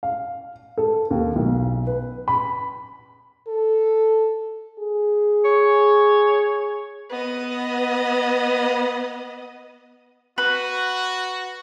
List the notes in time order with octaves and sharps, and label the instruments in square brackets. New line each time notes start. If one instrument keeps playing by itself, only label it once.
[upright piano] F5
A4
D#2
B1
B4
B5
[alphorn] A4
G#4
[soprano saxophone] C#5
[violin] B3 D#5
[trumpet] F#4 [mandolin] B4